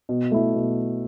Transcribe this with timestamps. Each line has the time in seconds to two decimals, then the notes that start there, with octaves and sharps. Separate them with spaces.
0.09 B2
0.31 A3 E4
0.54 B2